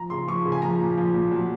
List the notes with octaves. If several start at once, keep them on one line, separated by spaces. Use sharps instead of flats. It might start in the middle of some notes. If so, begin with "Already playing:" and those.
Already playing: F3 A#5
C#3 C6
F3 C#6
C#3
G#5
F3 A#5
A#2
F3
A#2
F#3